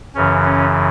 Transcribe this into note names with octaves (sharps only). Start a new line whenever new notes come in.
F#2 C#3 E3 C#4
C#4